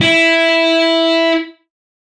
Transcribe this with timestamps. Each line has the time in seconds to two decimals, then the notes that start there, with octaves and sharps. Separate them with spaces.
0.01 E4